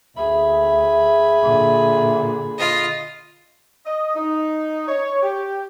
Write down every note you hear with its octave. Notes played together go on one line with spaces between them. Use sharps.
D2 G#4 E5 B5
A#2 D3
F4 D#5
D#5
D#4
C#5
G4